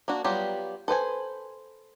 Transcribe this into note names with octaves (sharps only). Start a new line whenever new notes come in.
A#3 D4 F#4
F#3 G3 B3 F4 G4
A4 B4 C5 G#5